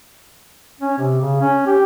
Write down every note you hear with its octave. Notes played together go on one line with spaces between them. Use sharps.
C#4
C3
C#3
C#4
G4